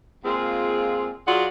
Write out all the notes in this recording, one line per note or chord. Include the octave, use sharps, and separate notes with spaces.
A#2 G#3 C4 F4 G#4
F#3 F4 F#4 G#4 D5 F#5